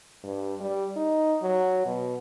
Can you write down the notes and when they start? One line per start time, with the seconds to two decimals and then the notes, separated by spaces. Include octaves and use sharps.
0.24 G2
0.60 G3
0.96 D#4
1.42 F#3
1.86 B2